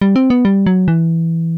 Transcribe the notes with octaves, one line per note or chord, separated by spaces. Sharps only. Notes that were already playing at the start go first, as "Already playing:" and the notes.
G3
C4
B3
G3
F#3
E3